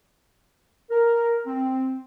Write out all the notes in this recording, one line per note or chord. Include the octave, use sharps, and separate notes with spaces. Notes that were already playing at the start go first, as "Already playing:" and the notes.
A#4
C4